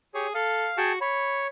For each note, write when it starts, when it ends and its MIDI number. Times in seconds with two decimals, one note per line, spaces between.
0.15 0.27 67
0.15 0.30 68
0.15 0.27 73
0.35 0.69 69
0.35 0.77 77
0.78 0.97 66
0.78 0.92 68
0.78 0.92 79
0.78 0.92 81
1.01 1.47 73
1.01 1.49 83